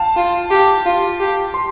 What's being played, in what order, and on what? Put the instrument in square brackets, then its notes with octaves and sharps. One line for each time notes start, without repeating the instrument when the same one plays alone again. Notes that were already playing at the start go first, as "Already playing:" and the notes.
Already playing: [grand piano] F5 G5 A5
[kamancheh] F4
G4
F4
G4
[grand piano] C6